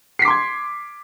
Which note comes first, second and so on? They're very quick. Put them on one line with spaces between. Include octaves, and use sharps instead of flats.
C7 B6 D6 C6 G#6